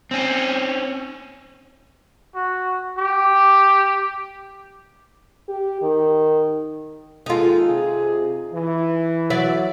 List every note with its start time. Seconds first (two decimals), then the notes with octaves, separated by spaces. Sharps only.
0.11 C4 C#4
2.35 F#4
2.98 G4
5.48 G4
5.82 D#3
7.26 D#2 G#3 D#4 F4 A4
7.66 C3 G#4
8.52 E3
9.30 F#3 D5 E5